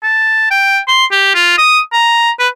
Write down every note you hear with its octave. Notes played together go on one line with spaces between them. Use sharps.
A5
G5
C6
G4
F4
D#6
A#5
B4